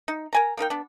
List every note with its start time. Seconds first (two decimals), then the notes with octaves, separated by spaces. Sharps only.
0.08 D#4
0.33 A#4 G#5 A#5
0.57 A#3 D#4 A#4 G5
0.70 B3 D4